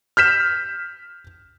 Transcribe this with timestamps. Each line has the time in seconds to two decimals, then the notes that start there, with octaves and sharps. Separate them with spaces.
0.17 F6 G6 B6 E7